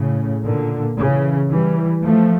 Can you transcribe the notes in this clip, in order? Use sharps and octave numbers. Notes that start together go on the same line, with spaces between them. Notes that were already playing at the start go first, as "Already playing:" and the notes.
Already playing: A2 C#3
A#2 D3
C#3 E3
E3 G3
F3 A3